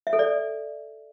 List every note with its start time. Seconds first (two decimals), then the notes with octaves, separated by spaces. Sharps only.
0.07 E5
0.13 A4
0.19 D5